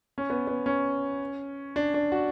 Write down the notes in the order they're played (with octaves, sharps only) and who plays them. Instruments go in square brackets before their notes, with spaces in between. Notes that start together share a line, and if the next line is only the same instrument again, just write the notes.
[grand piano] C#4
B3
B3
C#4
D4
D4
F#4